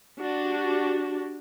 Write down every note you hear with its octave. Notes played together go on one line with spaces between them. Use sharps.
D4 F#4 G4